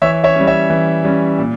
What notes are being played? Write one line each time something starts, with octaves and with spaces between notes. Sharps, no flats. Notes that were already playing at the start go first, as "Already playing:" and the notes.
E3 C#5 E5
C#5 E5
G3 C#4
C#5 E5
E3
G3 C#4
A#2